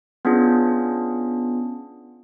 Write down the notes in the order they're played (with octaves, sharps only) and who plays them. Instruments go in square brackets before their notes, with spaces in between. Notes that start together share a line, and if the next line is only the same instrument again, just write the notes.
[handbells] B3 C#4 D4 F4 G#4